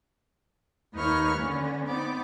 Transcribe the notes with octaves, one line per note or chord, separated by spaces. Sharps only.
D#2 D#4 B4 C#5 C#6 F6
D3 C#4
B3 C4 D#4 D5 D6